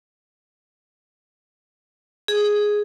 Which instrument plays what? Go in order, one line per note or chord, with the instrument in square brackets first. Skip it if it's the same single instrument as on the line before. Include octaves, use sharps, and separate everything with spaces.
[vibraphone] G#4